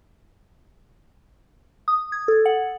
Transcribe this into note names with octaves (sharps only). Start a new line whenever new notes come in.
D#6
G#6
A4
F#5